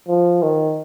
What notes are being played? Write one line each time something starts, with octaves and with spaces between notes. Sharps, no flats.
F3
D#3